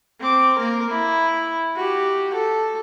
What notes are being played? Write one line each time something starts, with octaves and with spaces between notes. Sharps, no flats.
C4 D6
A#3 A#4
E4
F#4 G4
A4